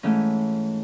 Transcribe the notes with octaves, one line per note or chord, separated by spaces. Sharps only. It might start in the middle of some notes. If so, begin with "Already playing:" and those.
G#2 E3 A3 C#4